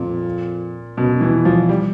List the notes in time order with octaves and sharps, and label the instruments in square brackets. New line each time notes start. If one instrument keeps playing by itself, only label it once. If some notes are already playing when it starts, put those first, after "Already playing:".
Already playing: [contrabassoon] F2 [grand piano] A#2
[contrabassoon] F#2 [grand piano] B2
[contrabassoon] F#2
[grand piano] E3
[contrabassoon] F2
[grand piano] F3
[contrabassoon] E2
[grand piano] G3